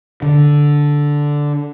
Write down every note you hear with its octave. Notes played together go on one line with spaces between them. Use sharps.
D3